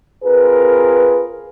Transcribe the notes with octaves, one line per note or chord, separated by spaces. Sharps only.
C4 F4 G#4 A#4 B4